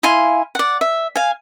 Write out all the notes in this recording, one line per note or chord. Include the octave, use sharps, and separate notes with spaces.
E4 F5 G#5 C6
D5 F#5
E5
F5 G#5